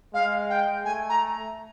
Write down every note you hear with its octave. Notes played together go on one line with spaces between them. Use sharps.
G#3 F5
G5
A3 G#5
A#5